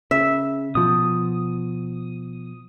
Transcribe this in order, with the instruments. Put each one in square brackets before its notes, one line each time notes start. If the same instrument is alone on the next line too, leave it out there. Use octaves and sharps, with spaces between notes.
[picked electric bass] C#3 [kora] E5
[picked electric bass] B2 F3 [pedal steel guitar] D#6